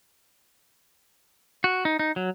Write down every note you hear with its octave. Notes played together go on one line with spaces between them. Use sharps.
F#4
D#4
D#4
F#3